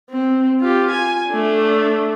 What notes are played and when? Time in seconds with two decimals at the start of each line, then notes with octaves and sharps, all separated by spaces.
0.10 C4
0.61 F4 G4
0.90 G#5
1.28 A3 D4